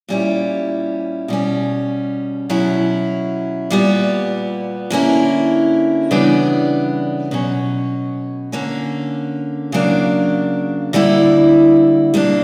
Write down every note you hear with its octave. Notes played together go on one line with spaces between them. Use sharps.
A#2 G3 C#4 E4
B2 G3 C#4
B2 F#3 C#4 E4
A#2 G3 B3
D3 A#3 C#4 E4
C#3 E3 G3 B3 D4
B2 F#3 C#4
D3 A#3 C#4
C#3 F#3 A#3 D4
D3 G3 A#3 E4
B2 G3 A#3 D4